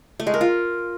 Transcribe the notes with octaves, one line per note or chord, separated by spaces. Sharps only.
A3
G#3
A#4
F4